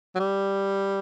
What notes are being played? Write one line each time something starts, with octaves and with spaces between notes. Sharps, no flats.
F#3
G3